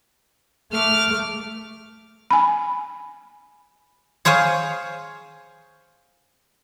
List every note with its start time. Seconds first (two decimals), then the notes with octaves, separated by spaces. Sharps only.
0.73 A3 D6 F6
2.31 G#5 B5
4.25 G#4 C5 C#5 F5 G#5